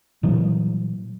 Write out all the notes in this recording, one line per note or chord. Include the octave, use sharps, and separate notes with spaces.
A#2 E3 F#3 G3